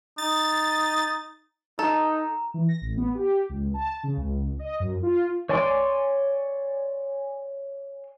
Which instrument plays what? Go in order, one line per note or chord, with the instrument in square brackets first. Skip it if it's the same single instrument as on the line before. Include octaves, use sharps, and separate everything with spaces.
[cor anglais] D#4 [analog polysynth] A6
[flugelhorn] D#4 [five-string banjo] A4 [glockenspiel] A#5
[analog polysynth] E3
A#6
A1
B3
G4
C#2
A5
C#3
C#2
D#5
F#2
F4
[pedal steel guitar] C#5 D5 G#5 C6 D6